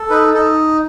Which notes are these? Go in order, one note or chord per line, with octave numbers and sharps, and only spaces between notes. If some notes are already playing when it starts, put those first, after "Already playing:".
Already playing: A4
D#4 B4
D#4 A4